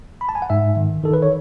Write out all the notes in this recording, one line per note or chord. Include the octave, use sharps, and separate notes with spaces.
B5
A5
G#5
F#5
G#2 E5
D#3
D#3 A4
B4
C#5